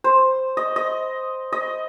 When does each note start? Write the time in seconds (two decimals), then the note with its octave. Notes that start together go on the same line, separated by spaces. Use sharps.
0.04 C5
0.57 D#5
0.76 D#5
1.52 D#5